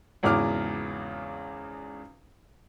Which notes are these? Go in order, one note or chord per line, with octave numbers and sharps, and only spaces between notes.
G#1 E2 C#3 D6 F6